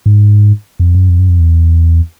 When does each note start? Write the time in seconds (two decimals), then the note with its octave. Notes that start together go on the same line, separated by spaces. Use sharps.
0.06 G#2
0.80 F2
0.94 F#2
1.09 F2
1.19 F#2
1.29 F2
1.39 E2